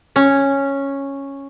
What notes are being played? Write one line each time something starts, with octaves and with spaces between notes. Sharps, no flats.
C#4